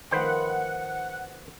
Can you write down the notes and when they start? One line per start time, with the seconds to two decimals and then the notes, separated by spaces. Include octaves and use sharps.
0.11 D#3 F3 A3 B4 C5 F#5 G5